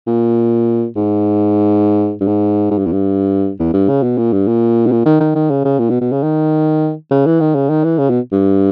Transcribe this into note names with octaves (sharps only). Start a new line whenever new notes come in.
A#2
G#2
G2
G#2
G#2
G2
E2
G2
E2
G2
C#3
B2
A#2
G2
A#2
B2
A#2
D#3
D#3
D#3
C#3
C#3
A#2
B2
B2
C#3
D#3
C#3
E3
D#3
C#3
D#3
E3
C#3
B2
G2